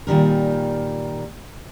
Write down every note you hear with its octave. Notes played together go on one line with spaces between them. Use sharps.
A#2 D#3 G3 A#4